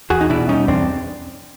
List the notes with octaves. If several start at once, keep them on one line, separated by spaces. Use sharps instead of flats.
E2 F#4 G#4
D#4
B2 D4 E4
G3 C#4 D#4
E2 C4 D4